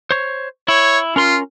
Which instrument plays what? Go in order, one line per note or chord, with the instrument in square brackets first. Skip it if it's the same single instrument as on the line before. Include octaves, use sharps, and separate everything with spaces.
[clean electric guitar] C5 C#5
[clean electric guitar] E4 [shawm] C#5
[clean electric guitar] C#4 A#4 C6 [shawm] F4